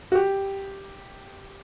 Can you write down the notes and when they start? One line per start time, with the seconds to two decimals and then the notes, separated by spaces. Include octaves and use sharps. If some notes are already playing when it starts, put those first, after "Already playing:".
0.12 F#4
0.15 G4